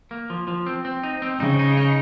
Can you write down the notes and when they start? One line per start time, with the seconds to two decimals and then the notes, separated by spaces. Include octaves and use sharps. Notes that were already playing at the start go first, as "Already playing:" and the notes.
0.11 A#3
0.30 F3
0.48 F3
0.66 C4
0.85 C4
1.03 D#4
1.22 C4
1.40 C#3 D#4
1.59 D#4
1.77 D#4